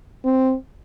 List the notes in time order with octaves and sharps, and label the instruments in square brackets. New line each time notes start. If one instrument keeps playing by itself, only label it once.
[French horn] C4